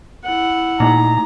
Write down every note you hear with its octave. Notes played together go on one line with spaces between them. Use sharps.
E4 F#5
A#2 A3 A#3 D#4 A#5